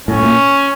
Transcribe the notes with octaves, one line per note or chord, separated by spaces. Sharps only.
A2 C#4
A#2